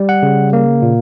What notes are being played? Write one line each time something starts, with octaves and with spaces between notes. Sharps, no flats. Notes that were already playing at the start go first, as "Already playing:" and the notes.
Already playing: G3
F#5
C#3
A#3
A#2